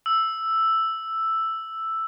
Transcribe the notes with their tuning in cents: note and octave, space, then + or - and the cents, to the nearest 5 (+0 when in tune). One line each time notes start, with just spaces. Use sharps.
E6 +5